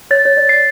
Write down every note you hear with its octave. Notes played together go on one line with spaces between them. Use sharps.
C#5 A6
C#5
D5
C7